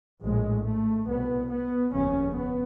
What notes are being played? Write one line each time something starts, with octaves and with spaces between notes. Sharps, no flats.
A#1 A2 G#3
A3
C2 B2 B3
B3
F1 D#2 C#3 C#4
B3